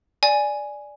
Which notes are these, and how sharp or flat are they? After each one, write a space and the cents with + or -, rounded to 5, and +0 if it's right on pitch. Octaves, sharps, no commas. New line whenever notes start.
D5 +0 G#5 +0